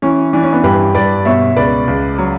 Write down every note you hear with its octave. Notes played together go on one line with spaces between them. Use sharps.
E3 C#4
E3 D4
C#4
B3 D4
G2 G4 B4
G2 B4 D5
B2 C#5 E5
C#2 B4 D5
C#2
F#3